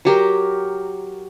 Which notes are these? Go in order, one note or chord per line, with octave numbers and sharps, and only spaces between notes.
F#3 G4 A#4